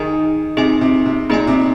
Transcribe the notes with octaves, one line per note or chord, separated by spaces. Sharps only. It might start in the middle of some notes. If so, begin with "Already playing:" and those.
Already playing: D#3 D#4 G#4 D#5 G#5
C3 D#4 G#4 D#5 G#5
C3
C3
A#2 D#4 G#4 D#5 G#5
C3